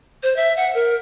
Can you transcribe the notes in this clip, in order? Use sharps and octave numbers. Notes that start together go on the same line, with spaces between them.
C5
E5
F#5
A#4